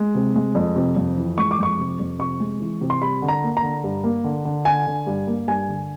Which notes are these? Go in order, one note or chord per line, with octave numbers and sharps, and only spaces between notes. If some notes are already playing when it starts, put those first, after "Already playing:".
Already playing: G#3
C3
G#3
F2
C3
F2
E3
G#3 C#6
D6
F2 C#6
C3
F2
C3 C#6
G#3
E3
C3
C6
G3 B5
D3
A#5
A#3
A#5
D3
G2
A#3
D3
D3
D3 G#5
D3
G2
A#3
G2 G#5
D3